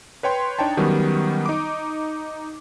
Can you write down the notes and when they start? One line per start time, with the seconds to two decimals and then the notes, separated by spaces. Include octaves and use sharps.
0.23 B4 C#5 G5 C6
0.59 D4 D#4 C#5 G5 A5
0.77 D#3 F#3 G3 B3 C#4
1.46 D#4 D6